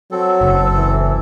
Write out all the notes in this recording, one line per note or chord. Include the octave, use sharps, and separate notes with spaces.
F#3 C4 A4
F#1
E3